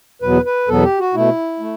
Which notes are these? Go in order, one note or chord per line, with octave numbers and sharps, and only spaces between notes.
E2 B2 F#3 B3 B4
B4
E2 B2 F#3 B3 A4
G4
F#4
B2 A3 E4
A3